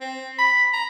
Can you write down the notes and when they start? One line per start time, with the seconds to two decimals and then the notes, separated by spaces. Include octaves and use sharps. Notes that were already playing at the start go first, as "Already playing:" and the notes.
0.01 C4
0.38 B5
0.73 A#5